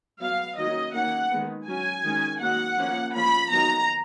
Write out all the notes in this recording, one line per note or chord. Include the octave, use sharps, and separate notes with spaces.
F#3 B3 F5
D#3 F#3 A#3 C#4 D#5
D#3 A#3 C#4 F#5
D#3 G#3 B3
F#3 C#4 G#5
D#3 G#3 C#4
D#3 F#3 A#3 F#5
F3 A#3 C#4
F3 A#3 C#4 B5
D#3 F#3 B3 A#5